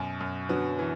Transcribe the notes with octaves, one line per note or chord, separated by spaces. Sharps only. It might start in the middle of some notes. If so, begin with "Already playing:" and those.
Already playing: F#2 B2
F#2
D3 F#3 B3
E3